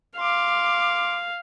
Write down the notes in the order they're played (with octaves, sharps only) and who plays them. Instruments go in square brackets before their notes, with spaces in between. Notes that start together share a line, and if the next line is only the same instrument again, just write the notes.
[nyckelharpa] F5 [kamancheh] C6 D6